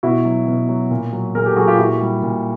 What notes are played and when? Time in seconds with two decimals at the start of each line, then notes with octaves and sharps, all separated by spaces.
0.03 B2 E4 F#4
0.25 F#3
0.47 B2
0.69 F#3
0.91 A#2
1.13 F#3
1.35 A#2 G#4 A#4
1.46 G4 A4
1.56 F#3 F#4 G#4
1.67 F4 G4
1.79 A#2 E4 F#4
2.01 G3
2.23 A#2